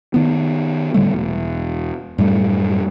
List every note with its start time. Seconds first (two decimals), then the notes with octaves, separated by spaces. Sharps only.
0.14 D#3 B3
0.94 A2 D3 G3 A3
1.12 E1
2.18 F#2 A2 G3 A3